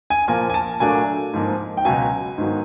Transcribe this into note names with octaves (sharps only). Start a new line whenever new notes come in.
G#5
A#2 F3 A#3 G#5
G#5
A5
A#2 F#3 A3 D4 G#5
G#2 F3 A#3
G5
C#2 B2 F#3 G#5
G#2 D#3 F#3 B3